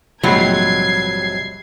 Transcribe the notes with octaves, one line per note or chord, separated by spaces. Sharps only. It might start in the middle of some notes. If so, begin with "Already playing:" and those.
A#1 G#2 C3 F#3 G3 G#6 C7